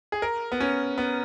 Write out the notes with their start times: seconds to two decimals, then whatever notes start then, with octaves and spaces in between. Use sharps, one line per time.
0.12 G#4
0.22 A#4
0.52 B3
0.60 C#4
0.98 B3